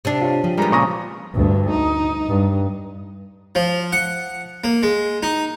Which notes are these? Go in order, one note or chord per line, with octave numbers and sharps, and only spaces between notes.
C3 D4
F4 C#5 F5
C#3 F3
D#3 G3 G#3 B3 A#5
A#2 C#3 C#6 D#6 A#6
D2 G2
D#4
G2
F3
F#5
A#3
G#3
D#4